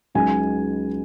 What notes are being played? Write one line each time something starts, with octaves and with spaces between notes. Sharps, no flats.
C#2 C#3 F#3 D#4 G#5